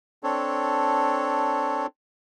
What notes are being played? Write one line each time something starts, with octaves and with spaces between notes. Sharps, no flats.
C4 D4 A4 C#5